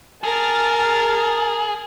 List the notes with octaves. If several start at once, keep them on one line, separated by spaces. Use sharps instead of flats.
G#4 A#4 A5 F6 A6